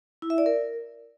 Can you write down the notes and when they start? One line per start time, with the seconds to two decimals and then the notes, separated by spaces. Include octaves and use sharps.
0.22 E4
0.30 E5
0.38 D5
0.46 A#4